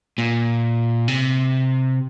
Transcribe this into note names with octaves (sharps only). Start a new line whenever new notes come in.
A#2
C3